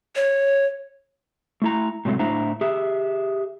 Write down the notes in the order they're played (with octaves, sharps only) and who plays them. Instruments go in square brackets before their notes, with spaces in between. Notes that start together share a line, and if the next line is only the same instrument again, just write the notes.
[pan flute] C#5
[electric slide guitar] A3 E4 A#5
A2 C3 F#3 G#3 A3
A2 D4 E4 C5 A#5
G4 G#4 E5